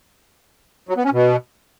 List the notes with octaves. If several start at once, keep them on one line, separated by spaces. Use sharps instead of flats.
F#3
B3
C#4
B2